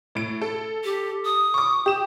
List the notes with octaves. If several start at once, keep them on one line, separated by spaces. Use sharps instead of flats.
A2 D7
A4
G4
D#6
C#6 D6
G4 E7